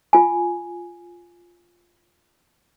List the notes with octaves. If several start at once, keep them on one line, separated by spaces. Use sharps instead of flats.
F4 G#5